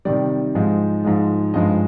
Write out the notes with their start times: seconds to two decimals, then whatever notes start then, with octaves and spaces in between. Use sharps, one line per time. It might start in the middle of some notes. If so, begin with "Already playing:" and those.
0.05 C3 D#3 G3 D5
0.55 G#2 F3 G#3
1.04 G#2 F3 G#3
1.54 G2 F3 G#3 D#5